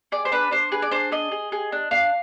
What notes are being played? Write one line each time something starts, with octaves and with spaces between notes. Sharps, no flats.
G#4 D5
C5
D4 B4
D4 C5
G#4 B4
D5
D4 C5
G#4 D#5
G#4
G#4
D4
D4 F5